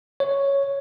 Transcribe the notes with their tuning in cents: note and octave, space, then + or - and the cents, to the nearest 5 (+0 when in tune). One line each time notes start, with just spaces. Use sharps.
C#5 +0